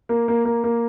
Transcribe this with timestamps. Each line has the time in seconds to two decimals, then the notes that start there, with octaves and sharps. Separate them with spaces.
0.09 A#3
0.28 A#3
0.45 A#3
0.64 A#3